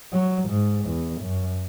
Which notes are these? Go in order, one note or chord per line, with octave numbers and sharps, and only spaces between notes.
F#3
G#2
E2
F#2